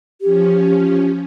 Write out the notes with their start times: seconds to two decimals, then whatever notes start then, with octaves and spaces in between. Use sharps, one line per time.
0.21 F3 C#4 G4